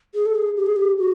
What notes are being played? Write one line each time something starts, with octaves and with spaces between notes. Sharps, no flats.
G#4
A4
G#4
G4
G#4
G4
F#4